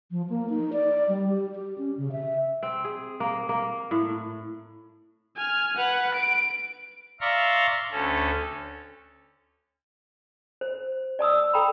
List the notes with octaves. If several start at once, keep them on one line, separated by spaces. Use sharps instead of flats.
F3
A#3
D#4
D5
G3
G4
G4
C#4
C#3
E5
C4
G#4
A#3
A#3
A2
G#5 F6
B4 F#5
D7
D5 E5 F5 A#5 C6 C#6
D2 C#4 A4
C5
D5 A5 D#6 E6
A4 G5 A#5 B5